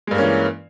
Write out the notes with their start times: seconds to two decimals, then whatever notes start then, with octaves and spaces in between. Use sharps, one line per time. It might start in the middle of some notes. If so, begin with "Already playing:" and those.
0.07 G#3
0.11 G2
0.15 A#3
0.18 C#4
0.22 E3